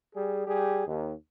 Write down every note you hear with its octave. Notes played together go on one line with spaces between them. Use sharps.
G3 G#4
G3 G4 G#4
D#2